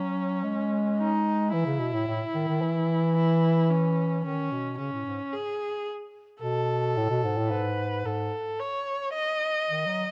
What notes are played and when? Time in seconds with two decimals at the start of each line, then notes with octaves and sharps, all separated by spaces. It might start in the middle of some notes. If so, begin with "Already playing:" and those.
Already playing: F#3 C#4
0.44 G#3
0.98 D#4
1.53 E3 E4
1.66 C#3
1.80 B2
1.94 A2
2.07 A2
2.35 D#3
2.48 D#3
2.61 E3
3.16 E4
3.70 C#4
4.24 D#3 C#4
4.52 B2
4.79 C#3 C#4
4.92 A2
5.06 G#2
5.33 G#4
6.42 B2 A4
6.97 A2
7.10 B2
7.24 G#2
7.38 A2
7.50 G#2 B4
8.05 G#2 A4
8.60 C#5
9.14 D#5
9.69 D#3
9.86 F#3